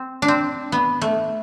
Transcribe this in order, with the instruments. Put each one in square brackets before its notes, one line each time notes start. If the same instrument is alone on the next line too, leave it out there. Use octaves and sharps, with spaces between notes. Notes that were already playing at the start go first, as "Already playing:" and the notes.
Already playing: [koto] C4
D4
C4
B3
A3